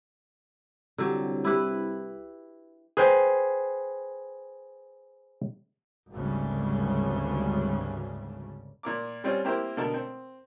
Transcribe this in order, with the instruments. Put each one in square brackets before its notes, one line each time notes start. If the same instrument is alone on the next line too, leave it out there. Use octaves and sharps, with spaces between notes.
[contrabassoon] C2 [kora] D3 F#3 G4
[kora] E4 G4 B4
[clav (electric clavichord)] G#4 B4 C5 G5
[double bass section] G#1 D2 C#3 G3
[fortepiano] A#2 A#4 D6
G3 C4 C#4 F4
A#3 C4 E4 G4 A#4 C5
B2 D3 A#4 A5
C4